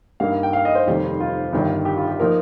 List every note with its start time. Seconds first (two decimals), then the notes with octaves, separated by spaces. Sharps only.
0.20 G2 G3 A#3 D#4 F5
0.32 F5
0.43 G5
0.53 F5
0.65 D#5
0.75 C5
0.87 F1 D#2 D#3 G3
1.20 F4
1.53 G1 G2 D#3 G3
1.85 G4
1.97 F4
2.08 G4
2.20 F3 A#3 D#4 A#4